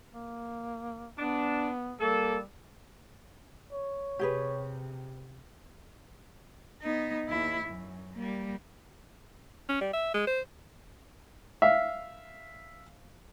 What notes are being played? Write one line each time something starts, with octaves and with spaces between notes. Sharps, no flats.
A#3
B3 D4
G3 A#3 A4
C#5
C3 G4 G#4 B4
B3 D#4
D#2 E4
F#2
G3 A#3
C#4
G3
E5
G#3
C5
E5 F5